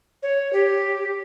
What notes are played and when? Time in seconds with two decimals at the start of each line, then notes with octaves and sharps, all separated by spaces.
0.23 C#5
0.53 G4